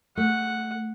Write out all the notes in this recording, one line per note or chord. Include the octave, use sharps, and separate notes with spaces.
A3 F#5